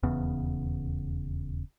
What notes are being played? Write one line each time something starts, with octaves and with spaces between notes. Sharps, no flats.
D#1 E2 C#3 B3